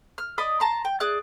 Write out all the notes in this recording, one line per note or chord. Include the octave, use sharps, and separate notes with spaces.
F6
D5 D#5 B5 D#6
A5 A#5 C6
G5
G#4 D5 F#6